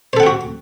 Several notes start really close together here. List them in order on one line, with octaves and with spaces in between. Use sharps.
C5 A4 F#5 G5 F#4